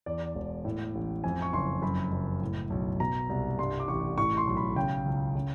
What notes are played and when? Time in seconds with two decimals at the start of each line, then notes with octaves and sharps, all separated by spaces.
0.06 E2 D5
0.35 E1
0.65 A2
0.95 A1
1.24 F2 G#5
1.42 C#6
1.53 F#1 C6
1.82 F#2 B5
2.12 F#1
2.42 A2
2.70 B1
3.00 B2 A#5
3.29 C2
3.59 G2 C6
3.80 D6
3.88 A1 C#6
4.18 A2 C#6
4.37 C6
4.47 B1
4.57 B5
4.76 C#3 G5
5.06 C#2
5.35 C#3